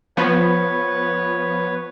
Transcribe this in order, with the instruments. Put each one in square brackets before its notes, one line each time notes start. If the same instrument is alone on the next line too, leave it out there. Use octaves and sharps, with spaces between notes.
[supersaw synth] F3 B3 [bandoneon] B4 C#5